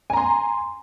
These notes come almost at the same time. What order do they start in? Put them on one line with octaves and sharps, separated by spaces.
G#5 A#5 C6